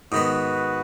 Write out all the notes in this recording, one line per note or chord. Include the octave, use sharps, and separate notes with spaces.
G#2 D#3 B3 F#4 B4